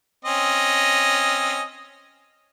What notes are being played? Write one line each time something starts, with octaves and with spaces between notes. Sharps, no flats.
C4 C#4 D#5